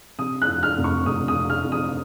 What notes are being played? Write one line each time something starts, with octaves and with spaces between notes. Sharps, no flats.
C3 D#6
F#6
F2
F6
F1
C#6
F1 D#6
D#6
C3
F6
F2
D#6